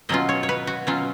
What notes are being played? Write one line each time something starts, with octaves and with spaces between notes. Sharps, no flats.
B2 F#3 C#4 F4 D#5
C#5
C#5
B4
F#4
B2 F#3 C#4 F4